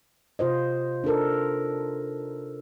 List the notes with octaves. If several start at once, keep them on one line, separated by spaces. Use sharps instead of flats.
C3 F4 C5 D#5
D4 D#4 A4 A#4